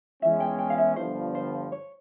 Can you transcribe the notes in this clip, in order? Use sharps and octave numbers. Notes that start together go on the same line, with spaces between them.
E2 E3 G#3 C#4 E5
G5
G5
F5
E5
G1 G2 F3 C5
C5
C#5